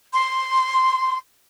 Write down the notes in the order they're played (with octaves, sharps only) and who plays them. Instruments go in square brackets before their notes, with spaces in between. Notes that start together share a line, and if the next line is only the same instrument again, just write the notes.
[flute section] C6